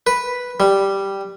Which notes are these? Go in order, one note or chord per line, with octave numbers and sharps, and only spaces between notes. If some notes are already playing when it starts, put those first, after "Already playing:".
B4
G3